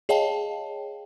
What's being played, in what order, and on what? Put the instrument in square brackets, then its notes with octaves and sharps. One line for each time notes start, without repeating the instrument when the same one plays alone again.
[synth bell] G#4 C#5 D#5 F5 G5 A5